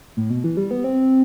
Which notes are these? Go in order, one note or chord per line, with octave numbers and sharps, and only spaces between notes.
A2
B2
E3
G3
B3
C4